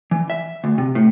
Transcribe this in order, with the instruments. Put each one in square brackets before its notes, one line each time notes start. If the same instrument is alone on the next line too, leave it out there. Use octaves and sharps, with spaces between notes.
[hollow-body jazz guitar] E3
E5
D2
C3
A2